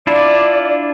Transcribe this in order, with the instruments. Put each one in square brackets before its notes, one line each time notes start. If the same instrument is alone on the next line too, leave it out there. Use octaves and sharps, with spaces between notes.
[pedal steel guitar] D4 E4 F4 [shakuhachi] D5